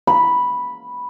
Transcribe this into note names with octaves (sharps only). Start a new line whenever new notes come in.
B5